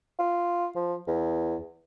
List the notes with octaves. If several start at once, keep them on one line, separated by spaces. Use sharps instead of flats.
F4
F3
E2